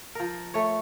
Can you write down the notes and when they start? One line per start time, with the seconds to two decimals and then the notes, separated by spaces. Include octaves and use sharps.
0.15 F3 A#4
0.54 A3 C#5